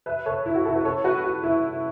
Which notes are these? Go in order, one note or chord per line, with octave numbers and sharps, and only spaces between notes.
B4 E5
A4 C#5
E4
F#4
E4 A4
F#4 B4
A4 C#5
F#4 B4
F#4
E4